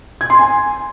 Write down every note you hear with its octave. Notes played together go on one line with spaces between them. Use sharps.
G#6
C6
G#5